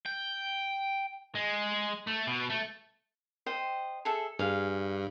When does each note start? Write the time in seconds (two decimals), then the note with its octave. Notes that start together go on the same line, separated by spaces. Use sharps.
0.06 G5
1.35 G#3
2.07 A3
2.27 B2
2.50 A3
3.46 C5 D#5 G5
4.05 G#4 A4 E5
4.39 G2 G#4 F5